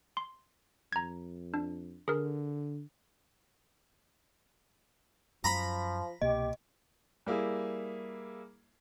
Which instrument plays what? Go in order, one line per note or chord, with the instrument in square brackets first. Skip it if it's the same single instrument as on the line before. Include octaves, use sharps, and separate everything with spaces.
[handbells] C6
[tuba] F2 [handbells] A#5 G#6
[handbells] D4
[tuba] D3 [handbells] G#4 A#4
[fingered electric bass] F#2 [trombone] F3 [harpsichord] A#5 B5
[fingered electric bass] C2 B2 A#3 [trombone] G4 [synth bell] D#5
[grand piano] G3 A#3 E4 G#4